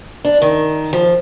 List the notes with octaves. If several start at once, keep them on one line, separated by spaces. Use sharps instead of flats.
D4
D#3
F3